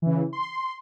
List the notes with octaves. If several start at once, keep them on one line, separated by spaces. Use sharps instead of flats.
C#3 E3
C6